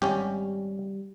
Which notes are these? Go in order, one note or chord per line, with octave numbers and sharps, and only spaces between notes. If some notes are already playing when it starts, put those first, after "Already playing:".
G#1 G3 C#4 G4